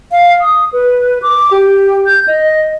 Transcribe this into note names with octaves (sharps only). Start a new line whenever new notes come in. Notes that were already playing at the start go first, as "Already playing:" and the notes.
F5
D#6
B4
D6
G4
G6
D#5